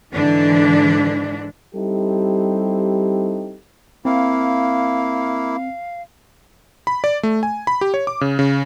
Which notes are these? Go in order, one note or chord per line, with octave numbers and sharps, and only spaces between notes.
G#2 D3 E3 D4
G3 C4 D#4 E4 G4 A4
A#3 C4 E4 F5
B5
D5
A3
G#5
B5
G4
C#5
D6
C#3
C#3